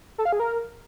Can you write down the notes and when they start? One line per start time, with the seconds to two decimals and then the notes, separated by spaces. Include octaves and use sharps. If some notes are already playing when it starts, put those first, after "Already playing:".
0.18 A4
0.25 F5
0.32 G#4
0.40 A#4